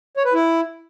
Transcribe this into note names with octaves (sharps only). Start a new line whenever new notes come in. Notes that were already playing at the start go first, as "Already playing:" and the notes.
C#5
B4
E4